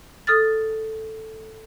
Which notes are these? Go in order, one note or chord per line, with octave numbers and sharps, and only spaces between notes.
A4 D#6 F6 A6